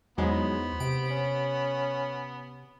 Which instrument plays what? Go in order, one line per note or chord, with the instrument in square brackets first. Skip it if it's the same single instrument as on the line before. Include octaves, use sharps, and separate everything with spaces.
[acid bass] E2 [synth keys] G#2 F#3 G#3 [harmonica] B3 [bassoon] C5
[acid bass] C3 [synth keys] D7
[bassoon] C#4